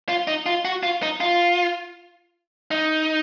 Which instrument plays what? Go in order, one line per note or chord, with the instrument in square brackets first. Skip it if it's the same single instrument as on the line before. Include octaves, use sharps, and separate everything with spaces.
[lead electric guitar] F4
D#4
F4
F#4
F4
D#4
F4
D#4